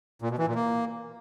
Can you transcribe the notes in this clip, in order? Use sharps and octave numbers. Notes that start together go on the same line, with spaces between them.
A#2
B2
E3
A#2
A#3